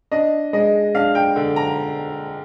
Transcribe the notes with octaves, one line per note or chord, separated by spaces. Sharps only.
D4 D#5
G#3 D#5
D4 F5
G5
D3
A#5